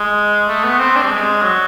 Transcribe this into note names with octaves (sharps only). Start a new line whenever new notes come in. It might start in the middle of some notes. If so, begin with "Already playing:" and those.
Already playing: G#3
A3
B3
C4
D4
G3
G#3
F#3